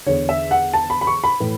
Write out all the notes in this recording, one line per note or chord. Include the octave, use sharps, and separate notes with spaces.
E2 D3 C#5
E5
F#5
A5
B5
B5
C#6
B5
A2 E3